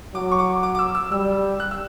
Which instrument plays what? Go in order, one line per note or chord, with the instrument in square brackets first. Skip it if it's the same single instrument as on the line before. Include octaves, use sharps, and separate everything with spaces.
[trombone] F#3 [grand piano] D6
[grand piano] C#6
D6
D6
D6
E6
E6
[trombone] G3 [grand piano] E6
[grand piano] F#6
E6